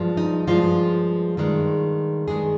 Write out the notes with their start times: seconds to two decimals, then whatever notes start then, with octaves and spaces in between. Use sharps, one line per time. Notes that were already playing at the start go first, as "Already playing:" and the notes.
Already playing: G2 F3 G#3
0.17 D#4
0.47 G2 F3 G#3 F4
1.37 G2 D#3 G#3
2.28 G2 D#3 G#3 G#4